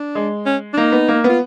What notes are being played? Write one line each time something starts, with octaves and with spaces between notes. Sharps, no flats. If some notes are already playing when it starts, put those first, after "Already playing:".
Already playing: D4
G#3
C#4
D4
A#3 D#4
B3
A#3
B3 F4